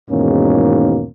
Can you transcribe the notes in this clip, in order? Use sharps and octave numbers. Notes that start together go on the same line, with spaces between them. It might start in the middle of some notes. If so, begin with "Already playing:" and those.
E2 G#2 B2 D#3 A#3 C#4